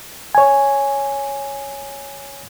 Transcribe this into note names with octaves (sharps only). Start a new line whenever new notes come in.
C#5 G#5